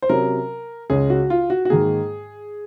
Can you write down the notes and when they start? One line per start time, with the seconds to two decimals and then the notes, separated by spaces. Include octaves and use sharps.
0.02 C5
0.09 C3 F#3 C#4 A#4
0.90 C#2 C#3 G#3 C#4 G#4
1.10 F#4
1.30 F4
1.50 F#4
1.65 F#4
1.70 G#2 D#3 A#3 G#4